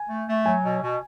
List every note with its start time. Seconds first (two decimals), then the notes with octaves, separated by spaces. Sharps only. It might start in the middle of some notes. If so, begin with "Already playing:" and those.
Already playing: G#5
0.10 A3
0.28 A3
0.45 F#3 G#5
0.64 B2
0.82 B2